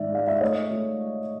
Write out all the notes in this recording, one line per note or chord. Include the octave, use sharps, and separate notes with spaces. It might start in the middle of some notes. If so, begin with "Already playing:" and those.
Already playing: G#2 D#3 D5 E5
G#3 F5
E5
A3 C#5 D#5
A3